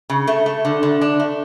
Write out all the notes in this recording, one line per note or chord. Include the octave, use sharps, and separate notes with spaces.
C#3
A3
A3
D3
D3
D4
A3